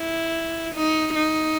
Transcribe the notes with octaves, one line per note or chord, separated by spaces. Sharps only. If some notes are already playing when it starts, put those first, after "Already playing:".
Already playing: E4
D#4
D#4